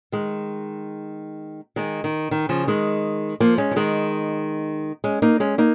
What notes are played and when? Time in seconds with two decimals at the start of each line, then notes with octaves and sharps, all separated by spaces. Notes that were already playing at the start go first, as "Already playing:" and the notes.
0.12 D#3 G#3
1.76 D#3 G#3
2.04 D#3
2.31 D#3
2.49 C#3 F3
2.67 D#3 G#3
3.40 F3 A#3
3.58 G#3 C#4
3.71 F3
3.76 D#3 G#3
5.04 G#3 C#4
5.22 A#3 D#4
5.40 G#3 C#4
5.58 A#3 D#4